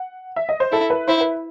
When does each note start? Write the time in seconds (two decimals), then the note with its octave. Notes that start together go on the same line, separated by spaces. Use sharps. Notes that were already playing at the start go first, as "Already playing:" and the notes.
Already playing: F#5
0.36 E5
0.49 D#5
0.60 C5
0.72 E4 A4
0.90 B4
1.08 E4 C5
1.21 B4